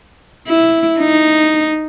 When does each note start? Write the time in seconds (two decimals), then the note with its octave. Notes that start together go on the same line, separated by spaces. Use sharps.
0.48 E4
0.99 D#4